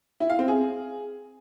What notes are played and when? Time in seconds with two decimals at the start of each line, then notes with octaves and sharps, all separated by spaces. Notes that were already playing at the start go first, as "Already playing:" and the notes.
0.20 E4
0.30 F5
0.39 C4
0.48 G#4